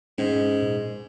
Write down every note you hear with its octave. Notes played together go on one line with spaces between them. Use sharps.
G#2 C#4
A#2